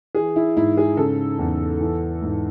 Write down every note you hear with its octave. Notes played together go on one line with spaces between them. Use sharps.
E3 G#4
E4
G#2 E4
G#4
C#3 A4
E2
E3
G#2